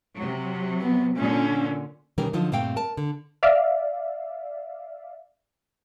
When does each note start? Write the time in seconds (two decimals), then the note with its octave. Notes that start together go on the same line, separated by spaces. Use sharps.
0.15 C3 F#3
0.81 B3
1.17 A#2 D3 C#4
2.18 B2 D#3 E3 G3 C#4 A#4
2.33 D3 F3 F#3 D#4 F4
2.52 G2 A#2 A3 C4 F5 G5
2.76 A#4 A5
2.97 D3
3.43 D5 E5 F5